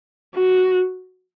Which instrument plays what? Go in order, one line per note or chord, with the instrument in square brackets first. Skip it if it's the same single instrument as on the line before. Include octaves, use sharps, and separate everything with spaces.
[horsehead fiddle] F#4